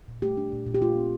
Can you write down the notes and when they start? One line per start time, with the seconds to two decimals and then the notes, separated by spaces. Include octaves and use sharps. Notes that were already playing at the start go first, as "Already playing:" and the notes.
0.08 A#2
0.22 A3 G4
0.37 D4
0.52 A#2
0.66 A#2
0.75 G4
0.81 A3 F4
0.96 C4